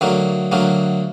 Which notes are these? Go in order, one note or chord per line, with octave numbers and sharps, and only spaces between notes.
D2 D3 F#3 A#3
D2 D3 F#3 A#3